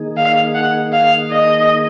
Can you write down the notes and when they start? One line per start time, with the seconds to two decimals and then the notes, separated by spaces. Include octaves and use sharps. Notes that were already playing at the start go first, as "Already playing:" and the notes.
Already playing: D#3 A#3 D#4 G#4
0.17 F5
0.55 F#5
0.92 F5
1.31 D#5